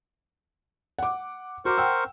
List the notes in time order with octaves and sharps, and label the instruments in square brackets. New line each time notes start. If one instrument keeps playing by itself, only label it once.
[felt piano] F#5 D6
[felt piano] F#4 D6 [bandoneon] A#4 C5 C#6
[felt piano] F#5 G5 E6